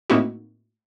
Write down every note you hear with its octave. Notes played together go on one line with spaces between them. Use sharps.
A2 A#3 C4 D#4 E4 F#4